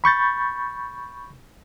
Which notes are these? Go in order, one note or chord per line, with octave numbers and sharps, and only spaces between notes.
B5 C#6 G6 A6